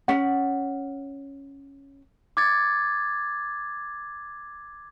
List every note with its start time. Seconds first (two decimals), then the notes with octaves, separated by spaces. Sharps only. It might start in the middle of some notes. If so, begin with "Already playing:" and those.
0.08 C#4 F#5
2.37 D6 G#6 A6